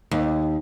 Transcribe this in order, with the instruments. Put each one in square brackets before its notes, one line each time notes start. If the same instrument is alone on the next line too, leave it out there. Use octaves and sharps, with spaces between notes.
[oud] D#2